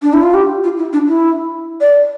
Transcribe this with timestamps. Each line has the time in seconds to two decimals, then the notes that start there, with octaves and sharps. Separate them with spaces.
0.02 D4
0.13 E4
0.23 F4
0.34 G4
0.63 F4
0.77 E4
0.93 D4
1.08 E4
1.81 D5